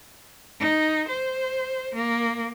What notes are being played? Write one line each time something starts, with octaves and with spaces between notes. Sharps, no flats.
D#4
C5
A#3